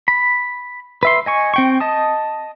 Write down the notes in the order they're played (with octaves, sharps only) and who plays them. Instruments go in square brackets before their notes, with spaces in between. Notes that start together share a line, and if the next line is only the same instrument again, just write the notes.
[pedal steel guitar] B5
B4 E5 C6
D#5 G#5 C#6
C4 G5 C#6
D#5 A5 D#6